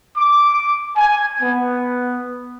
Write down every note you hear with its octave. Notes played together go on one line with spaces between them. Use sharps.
D6
G#5
B3